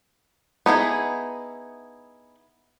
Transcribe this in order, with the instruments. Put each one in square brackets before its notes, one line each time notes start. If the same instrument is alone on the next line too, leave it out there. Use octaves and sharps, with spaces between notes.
[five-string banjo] B3 D#4 E4 G#4